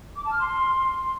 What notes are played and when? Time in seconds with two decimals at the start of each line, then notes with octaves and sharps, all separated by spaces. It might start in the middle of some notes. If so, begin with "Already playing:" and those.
0.16 D6
0.24 A5
0.32 F6
0.39 C6